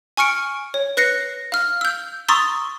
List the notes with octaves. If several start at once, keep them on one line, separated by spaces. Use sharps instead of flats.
G#5 C#6 F6 C#7 D7
C#5
B4 F#6 A#6 C7 C#7
F5 F6
E6 G6
A#5 C6 C#6 D#6 E6 A6